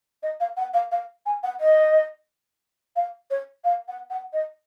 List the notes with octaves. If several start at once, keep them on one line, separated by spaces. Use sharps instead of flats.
D#5
F5
F#5
F5
F5
G#5
F#5
D#5
F5
C#5
F5
F#5
F#5
D#5